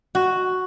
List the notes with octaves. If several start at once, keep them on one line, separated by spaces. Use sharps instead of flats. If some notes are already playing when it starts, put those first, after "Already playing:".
F#4